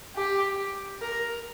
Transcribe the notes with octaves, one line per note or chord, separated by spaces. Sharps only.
G4
A#4